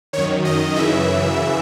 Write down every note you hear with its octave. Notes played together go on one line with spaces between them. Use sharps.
F#2 D#3 C#5
D#5
F#2 C#3 E3 E5